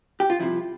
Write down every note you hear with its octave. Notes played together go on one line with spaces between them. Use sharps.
G4
F4
C2 C3 F3 E4